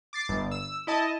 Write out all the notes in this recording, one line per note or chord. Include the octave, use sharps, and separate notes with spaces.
D6 A6 C7
G1
E6
E4 D#5 A5